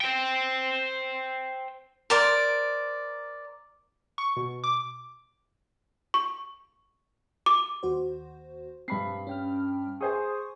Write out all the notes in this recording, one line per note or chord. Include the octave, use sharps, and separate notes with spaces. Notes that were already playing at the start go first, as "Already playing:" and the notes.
C5 G5
A#4 C5 D5
C#6
B2
D6
C#6
D6
D#2 F#4 C5
G2 C4 B5 C7
C#4 G5 F6
G#4 C5 G#5 C#6 D#6